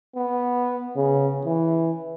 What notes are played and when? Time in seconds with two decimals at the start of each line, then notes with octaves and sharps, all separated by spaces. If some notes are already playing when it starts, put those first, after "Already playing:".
0.16 B3
0.96 C#3
1.45 E3